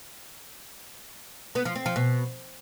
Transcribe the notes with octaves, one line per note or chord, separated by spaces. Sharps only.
B3
F3
C4
F3
B2